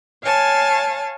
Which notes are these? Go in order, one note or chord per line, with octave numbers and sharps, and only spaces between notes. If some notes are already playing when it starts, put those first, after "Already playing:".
C#5 F5 G#5 A5